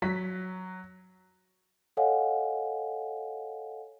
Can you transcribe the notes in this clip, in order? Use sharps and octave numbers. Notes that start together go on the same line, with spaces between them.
F#3 B6
A4 C#5 D#5 F5 F#5 G#5